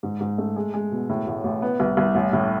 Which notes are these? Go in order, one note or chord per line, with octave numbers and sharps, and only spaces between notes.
G#2
G#2
A3
G#3
G#3
B2
A2
A1
A1
B3
C2
C2
A1
A2